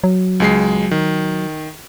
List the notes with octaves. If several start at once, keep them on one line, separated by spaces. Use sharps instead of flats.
F#3
C#2 G#3 C7
D#3